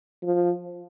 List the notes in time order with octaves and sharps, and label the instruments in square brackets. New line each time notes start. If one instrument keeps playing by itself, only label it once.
[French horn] F3